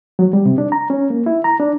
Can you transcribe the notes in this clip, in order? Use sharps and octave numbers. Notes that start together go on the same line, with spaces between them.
F#3
G3
C3
D4
A#5
C#4
A#3
E4
A#5
D4